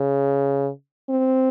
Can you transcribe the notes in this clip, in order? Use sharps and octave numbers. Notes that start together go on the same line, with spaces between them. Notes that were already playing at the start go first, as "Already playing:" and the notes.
Already playing: C#3
C4